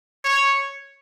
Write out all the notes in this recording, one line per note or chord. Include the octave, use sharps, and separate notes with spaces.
C#5